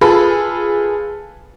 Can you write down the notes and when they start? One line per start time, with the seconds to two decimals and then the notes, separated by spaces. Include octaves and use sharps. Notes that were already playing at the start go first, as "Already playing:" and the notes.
0.01 F4 G#4 A4 B4 B5